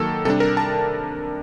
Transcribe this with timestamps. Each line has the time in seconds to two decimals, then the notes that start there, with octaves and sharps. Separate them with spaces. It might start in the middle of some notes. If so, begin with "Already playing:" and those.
Already playing: D#3 F#3 A#3 A4
0.25 C3 G3 D4 A4
0.40 A#4
0.57 A5